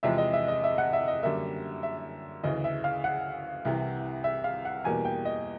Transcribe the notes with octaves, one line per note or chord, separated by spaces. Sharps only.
E2 C3 F3 G#3 E5
D#5
E5
D#5
E5
F#5
E5
D#5
F#2 D3 G3 A#3 E5
E5
D2 C#3 E3 D#5
E5
F5
F#5
C2 C3 E3
E5
F5
F#5
E2 B2 G3 A#3 G#5
G5
D#5